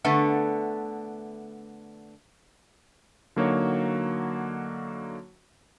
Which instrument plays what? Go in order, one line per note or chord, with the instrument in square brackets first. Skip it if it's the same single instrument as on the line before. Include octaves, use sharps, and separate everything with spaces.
[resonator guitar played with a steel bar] D3 A3 B3
[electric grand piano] D3 F#3 A#3 D#4 F#4 C#5